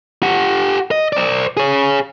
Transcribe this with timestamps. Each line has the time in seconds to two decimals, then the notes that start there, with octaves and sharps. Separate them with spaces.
0.23 G4 F#5
0.91 D#5
1.13 C5 D5
1.57 G#4 C#5